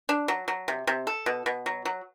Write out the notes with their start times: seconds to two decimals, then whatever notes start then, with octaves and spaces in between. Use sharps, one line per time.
0.09 D4
0.28 F#3
0.48 F#3
0.68 C3
0.87 C3
1.07 A4
1.26 B2
1.46 B2
1.66 F#3
1.85 F#3